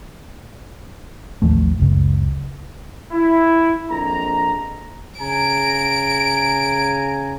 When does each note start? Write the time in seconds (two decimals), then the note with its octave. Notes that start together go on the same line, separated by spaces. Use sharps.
1.42 A1 D#2 F3 A3
1.80 F#1 C#2
3.12 E4
3.89 A#1 F2 A#5
5.21 C#3 G#5 A#5 D7